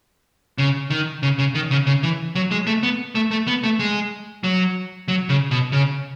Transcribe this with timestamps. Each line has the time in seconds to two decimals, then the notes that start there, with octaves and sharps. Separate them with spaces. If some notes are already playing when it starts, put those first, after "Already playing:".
0.58 C#3
0.90 D#3
1.23 C#3
1.39 C#3
1.55 D#3
1.71 C#3
1.87 C#3
2.03 E3
2.35 F#3
2.51 G#3
2.67 A3
2.83 B3
3.15 A3
3.31 A3
3.47 B3
3.64 A3
3.79 G#3
4.44 F#3
5.08 F#3
5.29 C#3
5.51 B2
5.72 C#3